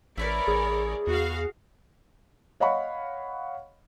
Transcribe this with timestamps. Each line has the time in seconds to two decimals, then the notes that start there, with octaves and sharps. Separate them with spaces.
0.18 A1 A3 E4 A#4 B4 C#5 D5
0.47 A1 G#4
1.07 E2 F#4 F5
2.60 C#5 D#5 F5 F#5 B5 C#6